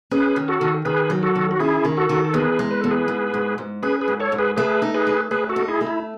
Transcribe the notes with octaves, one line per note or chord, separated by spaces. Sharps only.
C#4 G#4 B4
D#3
F#4 A4
D#3
D#3 G#4 B4
F#3
F#4 A4
D#3
F#4
C#4 E4 G#4
D#3
F#4 A4
D#3
A4
E2 G#4 B4
G#3
B4
E2 A4
G#4 B4
G#2
G#2
G#2
C#4 G#4 B4
G#4 B4
G#2
A4 C#5
G#2
G#4 B4
A3 G#4 B4
D#4
G#4 B4
A3
A3 G#4 B4
F#4 A4
D#4
E4 G#4
A3
E4